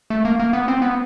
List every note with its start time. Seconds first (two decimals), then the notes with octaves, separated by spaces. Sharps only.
0.10 A3
0.25 A#3
0.39 A#3
0.53 B3
0.68 C4
0.82 B3